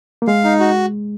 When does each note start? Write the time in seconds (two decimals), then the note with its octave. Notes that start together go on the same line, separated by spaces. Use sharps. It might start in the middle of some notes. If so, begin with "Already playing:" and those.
0.22 A#3
0.27 G#3 F5
0.44 D#4
0.60 F#4